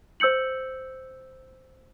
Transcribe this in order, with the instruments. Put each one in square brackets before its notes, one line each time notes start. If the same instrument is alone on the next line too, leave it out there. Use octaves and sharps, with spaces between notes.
[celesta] C5 E6 G6 C#7 F#7